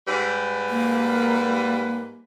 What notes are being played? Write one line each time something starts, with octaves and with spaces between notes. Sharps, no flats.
G#2 G3 B4
A#3